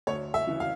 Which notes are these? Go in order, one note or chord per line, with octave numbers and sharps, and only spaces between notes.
D2 C#5
E5
C#3 E3
F5